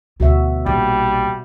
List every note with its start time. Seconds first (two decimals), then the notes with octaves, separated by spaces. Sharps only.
0.20 D2 B2 F#4 E5
0.66 A#1 G3